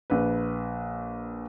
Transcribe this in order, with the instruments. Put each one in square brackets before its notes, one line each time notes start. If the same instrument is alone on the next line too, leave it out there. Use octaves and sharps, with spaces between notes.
[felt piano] A#1 B4